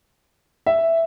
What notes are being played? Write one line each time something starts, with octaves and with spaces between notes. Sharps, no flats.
E5